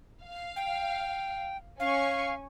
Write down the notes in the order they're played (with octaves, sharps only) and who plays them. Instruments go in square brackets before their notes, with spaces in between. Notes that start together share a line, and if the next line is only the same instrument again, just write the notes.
[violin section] F5
[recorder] G5
[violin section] C#4 G#5 C#6 [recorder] F5